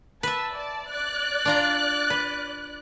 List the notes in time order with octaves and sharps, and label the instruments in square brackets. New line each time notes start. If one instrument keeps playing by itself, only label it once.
[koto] B4 E5 [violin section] A5
[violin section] D5 A5
D5 F#6
[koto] D4 F4 A#5
B4